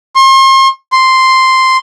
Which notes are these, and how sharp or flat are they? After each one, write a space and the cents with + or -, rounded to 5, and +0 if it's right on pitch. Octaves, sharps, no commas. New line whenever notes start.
C6 +40
C6 +0